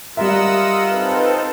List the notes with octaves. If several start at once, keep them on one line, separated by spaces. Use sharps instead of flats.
G3 F4 A#4 D#5 E5 F#5 E6
C4 D#4 A4 B4